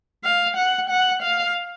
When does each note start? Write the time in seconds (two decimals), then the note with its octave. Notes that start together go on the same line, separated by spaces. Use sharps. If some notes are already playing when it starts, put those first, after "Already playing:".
0.24 F5
0.56 F#5
0.89 F#5
1.22 F5